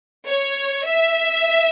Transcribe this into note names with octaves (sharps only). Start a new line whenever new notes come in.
C#5
E5